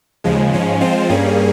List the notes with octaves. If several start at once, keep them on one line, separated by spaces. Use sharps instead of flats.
D#2 C#3 F3 G#3
G#2 F3 G#3 C#4
F3 G#3 C4 F4 C5
G2 G3 A#3 C#4 G#4